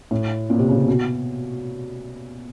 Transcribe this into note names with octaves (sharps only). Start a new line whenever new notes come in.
A2
A#2
C3
C#3
C3
B2